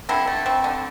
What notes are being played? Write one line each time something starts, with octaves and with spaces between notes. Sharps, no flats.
D3 C4 E4
A3
C4
D3